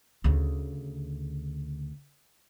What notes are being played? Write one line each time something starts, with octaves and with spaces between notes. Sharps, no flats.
D2 C#3